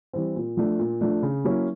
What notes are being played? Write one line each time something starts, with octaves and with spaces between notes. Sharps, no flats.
E3 G3 C4
A#2
F3 A3 D4
A#2
F3 A3 D4
C#3
F#3 A#3 C#4 E4